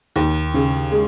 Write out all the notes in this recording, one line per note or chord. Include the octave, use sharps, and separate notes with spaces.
D#2
C#3
G#3